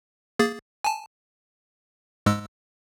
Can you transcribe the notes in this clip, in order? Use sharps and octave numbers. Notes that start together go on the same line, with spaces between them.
A#3 G#4 A6
G#5 A5
G#2 G#3 E6